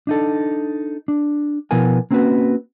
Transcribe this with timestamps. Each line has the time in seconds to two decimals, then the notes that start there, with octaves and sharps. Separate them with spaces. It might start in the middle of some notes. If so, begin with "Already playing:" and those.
0.07 D4 D#4 A4
1.08 D4
1.71 B2 F3 B3 E4 A#4 G#5
2.11 A#3 C4 C#4 E4 F#4 B4